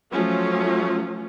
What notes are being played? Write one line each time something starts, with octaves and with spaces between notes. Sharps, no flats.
F3 F#3 A3 C#4 F4